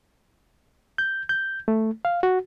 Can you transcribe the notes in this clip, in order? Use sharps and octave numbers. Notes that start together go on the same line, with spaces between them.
G6
G6
A3
F5
F#4